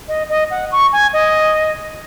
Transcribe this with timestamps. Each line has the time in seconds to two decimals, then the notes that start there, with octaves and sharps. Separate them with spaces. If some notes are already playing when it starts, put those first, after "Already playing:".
0.08 D#5
0.29 D#5
0.51 F#5
0.72 C#6
0.93 G#5
1.13 D#5